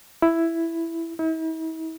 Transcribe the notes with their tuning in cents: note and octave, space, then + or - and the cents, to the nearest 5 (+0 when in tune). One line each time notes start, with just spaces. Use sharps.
E4 +5
E4 -45